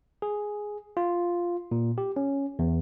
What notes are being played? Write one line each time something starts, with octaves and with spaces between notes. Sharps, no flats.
G#4
F4
A#2
G4
C#4
E2